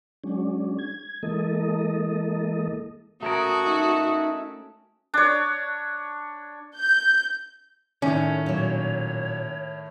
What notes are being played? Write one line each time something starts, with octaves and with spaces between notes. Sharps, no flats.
F#3 G#3 C#4 D4
G#6
E3 G#3 A#3 A4 D#5
A3 C#4 F#4 A#4 A5 D#6
D#4 E5
D4 C#5
G6
A2 D#3 A3 C#4 C#5
A#2 F#3